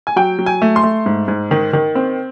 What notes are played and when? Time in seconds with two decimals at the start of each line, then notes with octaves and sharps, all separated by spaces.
0.07 G#5
0.16 F#3 G5
0.39 F#3
0.46 G#5
0.62 A3
0.76 C6
0.83 A3
1.06 G#2
1.28 G#2
1.51 D#3
1.73 D#3
1.95 C4